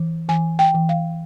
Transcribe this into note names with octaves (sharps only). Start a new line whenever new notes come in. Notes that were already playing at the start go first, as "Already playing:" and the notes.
Already playing: E3
E3 G#5
G5
E3
F5